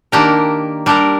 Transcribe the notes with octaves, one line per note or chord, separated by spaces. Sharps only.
D#3 A#3 D4 G4 A#4
G3 D4 G4 A#4